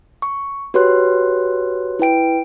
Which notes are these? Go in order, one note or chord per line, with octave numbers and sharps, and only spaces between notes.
C#6
F#4 G4 B4 C#5 C6 F#6
E4 B4 G5 D7